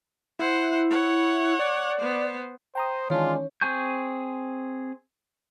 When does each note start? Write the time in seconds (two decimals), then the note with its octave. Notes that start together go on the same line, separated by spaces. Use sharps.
0.39 E4 C5 F#5
0.90 C#5 F#5
1.59 D5
1.99 B3 C5
2.75 C5 G5 A#5 D#6
3.10 D#3 E3 G#3 C#4 D4 F4 C#5
3.61 C4 G#4 G#5 C#6 G6